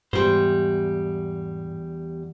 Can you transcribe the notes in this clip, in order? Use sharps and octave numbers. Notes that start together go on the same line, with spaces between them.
E2 G#2 G3 C5